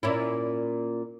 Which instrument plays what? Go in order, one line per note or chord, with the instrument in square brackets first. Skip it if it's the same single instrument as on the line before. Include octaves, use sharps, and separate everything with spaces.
[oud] A#2 C#4 E4